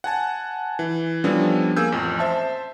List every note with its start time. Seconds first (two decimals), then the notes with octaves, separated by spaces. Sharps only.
0.04 F#5 G#5 A5
0.79 E3
1.24 F3 G3 B3 C#4 D4 A4
1.76 A#3 G#4 G#5 E6 G6
1.92 A1 F2
2.19 C5 E5 A5